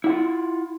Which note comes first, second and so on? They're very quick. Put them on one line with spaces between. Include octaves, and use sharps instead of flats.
E4 F#5 F4